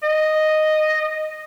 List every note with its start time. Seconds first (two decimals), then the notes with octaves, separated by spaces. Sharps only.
0.03 D#5